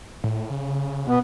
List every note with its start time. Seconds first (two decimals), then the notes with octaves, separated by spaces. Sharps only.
0.24 A2
0.50 C#3
1.07 B2 B3